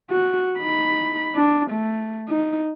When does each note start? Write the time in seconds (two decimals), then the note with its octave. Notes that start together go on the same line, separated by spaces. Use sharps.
0.11 F#4
0.59 D#4 B5
1.36 D4
1.71 A3
2.29 D#4